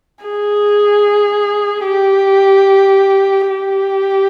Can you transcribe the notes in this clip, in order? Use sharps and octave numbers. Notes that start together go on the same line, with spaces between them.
G#4
G4
G4